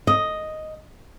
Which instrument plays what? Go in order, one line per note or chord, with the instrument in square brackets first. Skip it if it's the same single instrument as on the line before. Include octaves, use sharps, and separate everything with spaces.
[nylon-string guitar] D#5